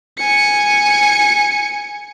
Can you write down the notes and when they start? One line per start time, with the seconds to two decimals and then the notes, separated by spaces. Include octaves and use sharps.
0.19 G#5 C#7